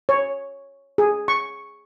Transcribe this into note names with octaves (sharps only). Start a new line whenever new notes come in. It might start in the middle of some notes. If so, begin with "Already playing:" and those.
C#5
G#4
C#6